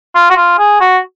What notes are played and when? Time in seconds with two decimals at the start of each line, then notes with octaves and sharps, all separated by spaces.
0.15 F4
0.30 F#4
0.37 F4
0.59 G#4
0.81 F#4